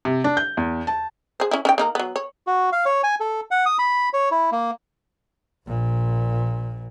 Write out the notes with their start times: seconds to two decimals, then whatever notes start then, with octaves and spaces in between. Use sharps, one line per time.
0.05 C3
0.24 D4
0.37 G6
0.57 E2
0.87 A5
1.40 G#4 C5
1.51 C#4 E4
1.65 C#4 D#4 G5
1.78 A#3 D#4 A#4
1.95 F#3 B3
2.16 C#5
2.47 F#4
2.73 F5
2.86 C#5
3.03 G#5
3.20 A4
3.51 F#5
3.66 D#6
3.79 B5
4.13 C#5
4.31 E4
4.52 A#3
5.67 A#1 A#2